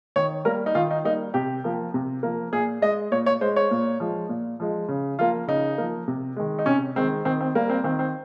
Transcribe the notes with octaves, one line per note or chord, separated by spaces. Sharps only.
D#3 C#5
G3 A#3 A#4
D#4
D#3 F4
D#4
G3 A#3 D#4
C3 G4
F3 A#3
C3
F3 A#3
A#2 G#4
G#3 D#5
A#2 C#5
C#5
G#3 C5
C#5
A#2
F3 G#3
A#2
F3 G#3
C#3
F3 A#3 F4
C#3 D#4
F3 A#3
C3
D#3 G#3
D#4
C3 C#4
D#3 G#3 C4
D#3 C4
C4
G3 A#3
C4
D#3 C4
C4